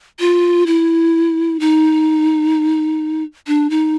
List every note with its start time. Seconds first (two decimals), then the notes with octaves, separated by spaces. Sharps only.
0.19 F4
0.66 E4
1.60 D#4
3.47 D4
3.70 D#4